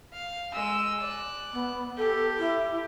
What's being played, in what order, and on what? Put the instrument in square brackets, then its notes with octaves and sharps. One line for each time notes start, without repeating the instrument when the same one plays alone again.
[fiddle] F5
G#3 E6
D5 F#6
[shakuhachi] B3
[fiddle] G4 [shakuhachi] A4
[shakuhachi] E4